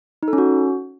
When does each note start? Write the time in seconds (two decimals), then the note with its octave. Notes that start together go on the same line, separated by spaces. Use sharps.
0.23 D#4
0.28 A4
0.33 C#4
0.38 F#4